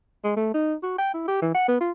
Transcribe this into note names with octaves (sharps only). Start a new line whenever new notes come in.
G#3
A3
D#4
F#4
G5
E4
G4
E3
F#5
B3
F4